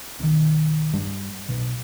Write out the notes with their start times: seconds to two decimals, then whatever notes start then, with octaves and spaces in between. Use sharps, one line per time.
0.20 B1 D#3
0.93 G2 G3
1.49 B1 B2